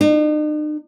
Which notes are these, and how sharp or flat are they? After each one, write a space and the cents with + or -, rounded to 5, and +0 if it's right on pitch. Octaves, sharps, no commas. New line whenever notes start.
D#4 -45